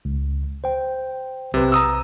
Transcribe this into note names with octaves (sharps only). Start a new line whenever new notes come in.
C#2
C5 G5
B1 C3 B4
A#5 D#6 E6